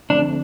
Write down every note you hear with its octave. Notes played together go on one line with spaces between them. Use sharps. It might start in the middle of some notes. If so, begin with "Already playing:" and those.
D3 F3 A3 C4 D4